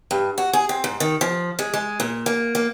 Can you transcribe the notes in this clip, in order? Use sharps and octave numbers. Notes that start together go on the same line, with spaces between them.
G2
F#4
G#4
C4
G#2
D#3
F3
G#3
G#3
A#2
A#3
A#3